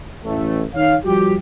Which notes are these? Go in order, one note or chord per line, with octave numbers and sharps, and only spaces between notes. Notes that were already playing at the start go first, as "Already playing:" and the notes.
A1 A3
D#3 D#4 C#5 F5
F3 G3 F#4 G4